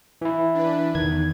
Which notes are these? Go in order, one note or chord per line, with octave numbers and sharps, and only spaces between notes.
E3 E4
D4 B4
E2 D#3 G#6